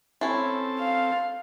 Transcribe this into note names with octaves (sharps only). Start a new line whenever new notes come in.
C4 C#4 E4 A4
F5